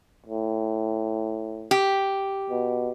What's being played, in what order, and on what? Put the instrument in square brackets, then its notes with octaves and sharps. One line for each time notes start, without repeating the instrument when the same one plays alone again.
[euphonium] A2
[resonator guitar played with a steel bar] G4
[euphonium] B2